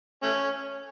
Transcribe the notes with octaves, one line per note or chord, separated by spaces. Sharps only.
A3 C#4